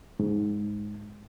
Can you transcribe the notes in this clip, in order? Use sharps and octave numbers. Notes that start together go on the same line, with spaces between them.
G#2